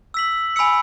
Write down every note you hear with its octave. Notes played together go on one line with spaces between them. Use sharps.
E6 B6 F#7
G#5 B5 E6 C#7